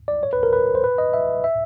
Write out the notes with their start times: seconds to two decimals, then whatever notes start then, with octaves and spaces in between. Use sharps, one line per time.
0.08 D5
0.23 C#5
0.33 B4
0.43 A#4
0.53 B4
0.75 C5
0.84 B4
0.98 D#5
1.14 E5
1.44 E5